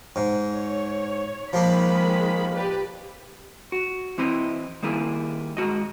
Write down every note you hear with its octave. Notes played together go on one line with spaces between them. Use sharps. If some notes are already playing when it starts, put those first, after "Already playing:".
G#2
C#5
D#3 F3 G#3 A#3 B5
G4 B4 D5
F#4
E3 C4 E4 D#5
D#3 G3 A#3 E4 G#4
G#2 F#4 D#5